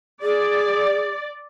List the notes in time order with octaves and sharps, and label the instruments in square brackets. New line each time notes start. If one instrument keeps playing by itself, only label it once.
[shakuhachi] G#4 [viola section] D5